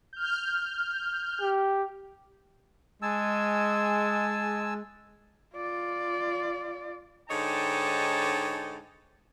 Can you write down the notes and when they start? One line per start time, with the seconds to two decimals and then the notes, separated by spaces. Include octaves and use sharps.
0.13 F6 G6
1.41 G4
3.02 G#3 G#5 A5 E6
5.55 F4 D5
7.30 G#2 D3 D#4 C#5 G5 A5